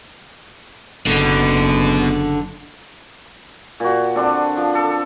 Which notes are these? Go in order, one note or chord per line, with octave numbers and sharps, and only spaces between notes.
F#1 B2 D3
A#2 F#4
D3 C4 D4
F3
A4